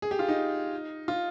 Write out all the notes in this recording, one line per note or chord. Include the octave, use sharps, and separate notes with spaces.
G#4
G4
F4
D#4
F4